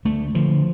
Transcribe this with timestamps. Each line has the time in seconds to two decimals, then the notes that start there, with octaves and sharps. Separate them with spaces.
0.05 D2 A3
0.34 D3 F3